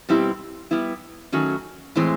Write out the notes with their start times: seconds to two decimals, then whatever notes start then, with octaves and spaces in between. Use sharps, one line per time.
0.09 B2 G3 C4 E4 G4
0.71 G3 B3 E4
1.32 D#3 F#3 A3 C#4 F#4
1.96 A2 E3 G#3 C4